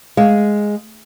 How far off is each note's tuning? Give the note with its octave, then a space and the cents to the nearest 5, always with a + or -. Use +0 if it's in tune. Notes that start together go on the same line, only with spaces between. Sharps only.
G#3 +0 F5 +0